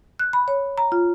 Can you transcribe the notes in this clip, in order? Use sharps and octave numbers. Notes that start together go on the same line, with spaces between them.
F#6
B5
C#5
A#5
F4